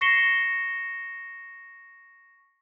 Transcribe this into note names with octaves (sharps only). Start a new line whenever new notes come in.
C#6 A#6 C7 C#7 E7 G7